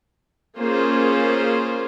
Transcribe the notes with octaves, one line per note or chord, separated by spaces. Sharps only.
A#3 C#4 F4 G#4 C5